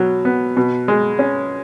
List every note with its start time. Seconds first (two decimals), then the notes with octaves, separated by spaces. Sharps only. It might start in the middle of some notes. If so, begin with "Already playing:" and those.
Already playing: B2 F#3
0.25 B3
0.57 B2
0.88 G#3
1.19 C#4